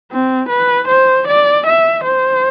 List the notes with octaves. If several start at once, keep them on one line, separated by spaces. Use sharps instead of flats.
C4
B4
C5
D5
E5
C5